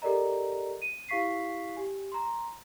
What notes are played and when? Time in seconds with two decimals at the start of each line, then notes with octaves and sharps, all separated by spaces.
0.02 G4 A4 A#4 D5 D#5 A#5
0.82 D#7
1.09 E4 G4 F5 C#6 B6 C7
1.76 G4 G#5
2.12 A#5 C6